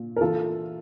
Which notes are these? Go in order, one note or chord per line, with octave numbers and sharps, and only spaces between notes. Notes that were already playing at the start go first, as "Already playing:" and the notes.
Already playing: A#2
A#4
E3 F4 A4